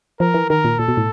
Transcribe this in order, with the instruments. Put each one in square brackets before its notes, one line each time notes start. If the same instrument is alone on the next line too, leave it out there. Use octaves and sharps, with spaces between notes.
[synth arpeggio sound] F3 [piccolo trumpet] A#4
[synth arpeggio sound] E3
[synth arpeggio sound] D#3 [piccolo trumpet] A#4
[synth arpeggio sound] A#2
[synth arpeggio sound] A#2 [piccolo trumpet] A4
[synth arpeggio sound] B2
A2